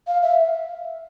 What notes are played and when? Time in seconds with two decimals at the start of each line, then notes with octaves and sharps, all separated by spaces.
0.07 F5
0.23 E5